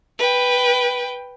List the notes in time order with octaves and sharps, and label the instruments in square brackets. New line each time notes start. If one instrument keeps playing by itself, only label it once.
[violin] B4 G5